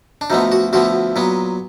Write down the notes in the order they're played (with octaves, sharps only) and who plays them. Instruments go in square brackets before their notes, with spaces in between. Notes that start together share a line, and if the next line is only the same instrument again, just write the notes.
[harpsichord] D4
D2 D3 F3 B3 D#4
F#4
D2 D3 F3 B3 F#4
A#2 F#3 B3